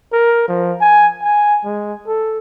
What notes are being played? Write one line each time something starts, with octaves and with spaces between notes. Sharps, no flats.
A#4
F3
G#5
G#5
G#3
A4